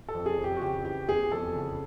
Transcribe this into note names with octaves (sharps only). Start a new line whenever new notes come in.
A4
F2
G#4
F2
G4
F#4
C#3 G4
E3 G4
E2 G#4
F2 A4
C#3